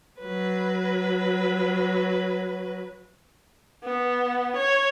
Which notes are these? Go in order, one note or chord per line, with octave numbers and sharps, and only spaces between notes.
F#3 B4
B3
C#5